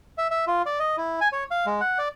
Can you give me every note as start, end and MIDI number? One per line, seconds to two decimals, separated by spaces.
0.18 0.27 76
0.31 0.45 76
0.47 0.62 65
0.66 0.79 74
0.79 0.96 75
0.97 1.20 64
1.21 1.28 80
1.32 1.44 73
1.51 1.66 77
1.66 1.81 56
1.81 1.98 78
1.98 2.08 74